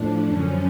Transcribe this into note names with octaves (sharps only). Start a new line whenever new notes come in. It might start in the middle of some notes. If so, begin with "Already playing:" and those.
Already playing: A2 F3 D4
F#2 D3 F3 C#4